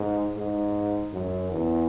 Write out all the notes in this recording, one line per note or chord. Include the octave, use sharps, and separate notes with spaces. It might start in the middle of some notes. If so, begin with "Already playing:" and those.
Already playing: G#2
G#2
F#2
E2